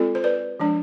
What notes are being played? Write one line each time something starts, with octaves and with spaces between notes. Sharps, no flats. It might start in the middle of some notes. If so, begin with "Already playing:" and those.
Already playing: G#3 C4 F4 A4
C5
B4 D5
F3 G#3 D4